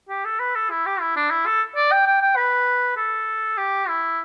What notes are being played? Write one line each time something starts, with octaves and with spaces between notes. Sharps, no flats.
G4
A4
B4
A4
E4
G4
E4
D4
E4
A4
D5
G5
G5
G5
B4
A4
G4
E4